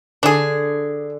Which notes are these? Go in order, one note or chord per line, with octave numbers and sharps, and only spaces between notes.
D3 D4 G#4